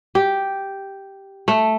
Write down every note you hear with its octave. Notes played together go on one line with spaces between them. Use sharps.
G4
A3